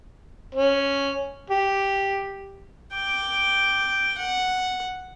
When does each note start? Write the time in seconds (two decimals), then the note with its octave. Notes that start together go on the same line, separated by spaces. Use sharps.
0.55 C#4
1.50 G4
2.93 G5 D6
4.18 F#5